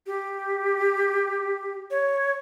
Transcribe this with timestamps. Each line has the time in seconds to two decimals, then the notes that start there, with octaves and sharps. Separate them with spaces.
0.07 G4
1.91 C#5